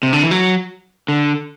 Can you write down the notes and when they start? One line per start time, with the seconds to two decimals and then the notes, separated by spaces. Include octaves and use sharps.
0.03 C3
0.13 D3
0.23 E3
0.31 F#3
1.08 D3